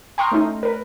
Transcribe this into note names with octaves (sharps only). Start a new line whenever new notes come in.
G5 A#5 C6 C#6 D#6 F6
A3 C#4 D#4
A#4 B4